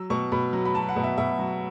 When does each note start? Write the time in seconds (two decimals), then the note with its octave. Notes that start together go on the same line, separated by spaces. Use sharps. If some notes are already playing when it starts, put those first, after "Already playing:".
Already playing: F#3 E6
0.10 B2 C#6
0.32 B2 B5
0.53 F#3
0.65 B5
0.75 F#3 A5
0.89 F#5
0.96 B2
1.03 E5
1.17 B2 E5
1.39 F#3